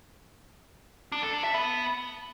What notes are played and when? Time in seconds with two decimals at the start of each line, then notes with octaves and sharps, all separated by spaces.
1.12 D4
1.23 A4
1.33 D4
1.44 E5
1.54 B3